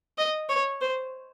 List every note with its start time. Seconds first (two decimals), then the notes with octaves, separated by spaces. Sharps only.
0.18 D#5
0.49 C#5
0.81 C5